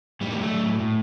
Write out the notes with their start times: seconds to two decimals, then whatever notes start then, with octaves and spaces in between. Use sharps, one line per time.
0.21 A2 G3
0.32 A#3
0.37 F#3
0.42 A3
0.50 F#3
0.66 A2
0.80 A2